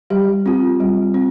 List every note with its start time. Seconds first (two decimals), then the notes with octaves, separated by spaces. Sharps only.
0.10 G3 G4
0.46 C4 F4
0.80 G3
1.14 C4